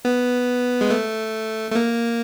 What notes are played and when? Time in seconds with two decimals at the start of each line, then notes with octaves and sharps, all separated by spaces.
0.05 B3
0.81 G#3
0.90 A3
1.71 A3
1.75 A#3